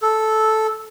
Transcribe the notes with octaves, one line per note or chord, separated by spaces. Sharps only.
A4